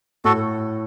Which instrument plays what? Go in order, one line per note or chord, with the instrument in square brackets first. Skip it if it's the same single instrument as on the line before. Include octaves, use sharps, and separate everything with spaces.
[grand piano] A2 [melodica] F#4 A4